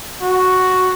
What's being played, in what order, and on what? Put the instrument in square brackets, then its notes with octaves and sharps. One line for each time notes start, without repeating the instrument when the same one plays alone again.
[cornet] F#4